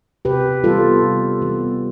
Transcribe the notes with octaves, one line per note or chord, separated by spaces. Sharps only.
C3 G4 B4
E3 G3 B3 F4 A4
C3
E3 G3 B3